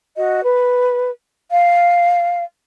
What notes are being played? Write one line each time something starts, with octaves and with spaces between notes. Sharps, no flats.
F#4 D#5
B4
F5